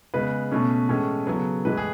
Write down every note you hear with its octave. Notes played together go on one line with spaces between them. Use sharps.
C#3 G#3 B3 B4
B2 A3 C#4
A2 E3 G#3 C#4 A4
C#3 F#3 B3
A2 E3 G#3 B4
G#4